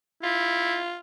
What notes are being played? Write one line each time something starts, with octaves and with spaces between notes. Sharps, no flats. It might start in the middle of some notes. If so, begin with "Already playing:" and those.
E4 F4